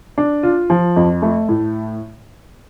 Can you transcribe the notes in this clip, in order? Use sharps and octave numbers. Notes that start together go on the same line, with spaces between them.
D4
F4
F3
F2
A3
A2